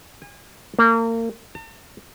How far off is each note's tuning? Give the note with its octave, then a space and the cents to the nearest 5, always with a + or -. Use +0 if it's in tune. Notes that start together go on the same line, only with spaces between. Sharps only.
G#5 -35
A#3 -35
A5 +45